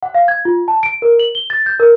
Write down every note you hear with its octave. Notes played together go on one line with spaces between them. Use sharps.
F#5
F5
G#6
F4
A5
D7
A#4
F#7
G7
A6
G6
A#4